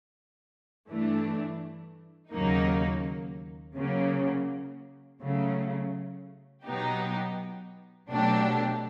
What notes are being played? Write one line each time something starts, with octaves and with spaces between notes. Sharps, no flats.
G2 E3 A3 D4
D#2 C#3 F#3 A#3 D#4
C#3 F#3 A#3
C#3 F#3 A3
B2 F#3 B3 D#4 G4
B2 F#3 A3 D4 G4